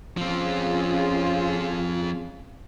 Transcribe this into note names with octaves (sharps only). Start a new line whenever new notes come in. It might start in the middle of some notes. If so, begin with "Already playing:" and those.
F3 C4 C#4 F4 G#4